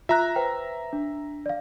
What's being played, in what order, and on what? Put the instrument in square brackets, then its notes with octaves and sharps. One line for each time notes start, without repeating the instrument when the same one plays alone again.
[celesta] F4 F#6 [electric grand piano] E5 A#5
[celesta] B4 C5 G5
D4
D5 F5